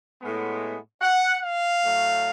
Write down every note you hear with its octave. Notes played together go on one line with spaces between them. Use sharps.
A2 G#3 B3
F#5
F5
A2 F#3 A3